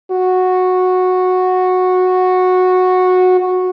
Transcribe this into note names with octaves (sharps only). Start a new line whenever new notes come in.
F#4
F#4